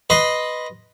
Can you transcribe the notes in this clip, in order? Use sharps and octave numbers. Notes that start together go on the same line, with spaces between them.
B4 D#5 B5 C6